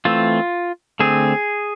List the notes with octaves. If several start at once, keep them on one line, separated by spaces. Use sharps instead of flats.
E3 A3 C4 F4
D3 A3 C4 G#4